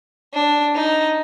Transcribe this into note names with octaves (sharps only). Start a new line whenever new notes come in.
D4
D#4